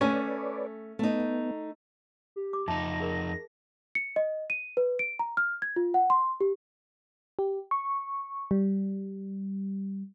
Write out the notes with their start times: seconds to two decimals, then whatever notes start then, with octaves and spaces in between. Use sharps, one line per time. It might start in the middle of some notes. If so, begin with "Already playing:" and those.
0.01 A3 C#4 B4 C#5 D5 G#5
0.99 A3 B3 D#4
2.36 G4
2.53 D6
2.68 F2 D#4 E5 A5 A#6
3.00 G#4 A#4
3.95 C#7
4.16 D#5
4.50 D#7
4.77 B4
4.99 D7
5.19 A#5
5.37 F6
5.62 G#6
5.76 F4
5.94 F#5
6.10 C6
6.41 G4
7.39 G4
7.71 C#6
8.51 G3